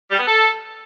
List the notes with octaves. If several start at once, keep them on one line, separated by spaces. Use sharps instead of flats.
G3
B3
A4